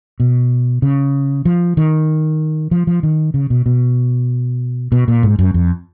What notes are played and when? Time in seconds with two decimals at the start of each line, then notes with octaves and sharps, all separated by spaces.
0.20 B2
0.82 C#3
1.45 F3
1.77 D#3
2.71 F3
2.87 F3
3.03 D#3
3.34 C#3
3.50 B2
3.66 B2
4.92 B2
5.08 A#2
5.23 G#2
5.39 F#2
5.54 F2